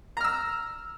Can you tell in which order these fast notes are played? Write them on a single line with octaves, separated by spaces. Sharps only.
A#5 F6 E6